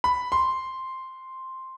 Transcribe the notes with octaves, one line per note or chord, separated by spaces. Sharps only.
B5
C6